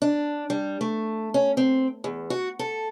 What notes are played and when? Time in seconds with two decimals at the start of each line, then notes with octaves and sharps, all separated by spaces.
0.02 D4
0.50 G3
0.81 A3
1.34 C#4
1.57 C4
2.04 E2
2.30 F#4
2.59 A4